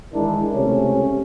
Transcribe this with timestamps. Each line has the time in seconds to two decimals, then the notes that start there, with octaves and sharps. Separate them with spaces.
0.13 D#3 E3 G#3 D4 E4 A#4
0.54 C#2 C3 A3 C#4